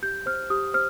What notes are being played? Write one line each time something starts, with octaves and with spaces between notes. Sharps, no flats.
G4 G6
C5 F6
G4 D#6
C5 F6